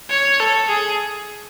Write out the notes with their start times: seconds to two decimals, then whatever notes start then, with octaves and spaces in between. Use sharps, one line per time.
0.10 C#5
0.40 A4
0.69 G#4